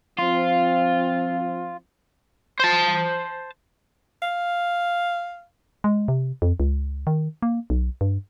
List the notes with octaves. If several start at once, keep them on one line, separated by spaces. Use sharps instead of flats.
F3 C4 F4
C5 A5
F5
G#3
C3
F2
C#2
D#3
A#3
B1
G2